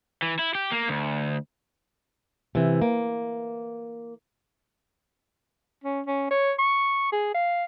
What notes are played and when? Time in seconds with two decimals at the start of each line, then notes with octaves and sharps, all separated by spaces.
0.22 E3
0.39 E4
0.55 G4
0.72 A#3
0.89 D2
2.55 C3 E3
2.82 A#3
5.84 C#4
6.07 C#4
6.31 C#5
6.59 C#6
7.12 G#4
7.34 F5